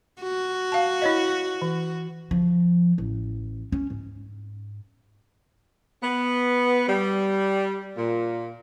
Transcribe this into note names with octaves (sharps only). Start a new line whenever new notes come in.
F#4
F5 A5
E4 C#5 D#5
E3
F3
A1
C#4
G#2
B3
G3
A#2